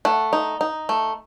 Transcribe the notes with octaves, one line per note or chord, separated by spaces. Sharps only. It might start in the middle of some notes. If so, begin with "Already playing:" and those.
A3 F#5
D#4
D#4
A3